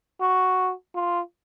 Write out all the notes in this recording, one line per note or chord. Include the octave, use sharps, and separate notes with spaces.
F#4
F4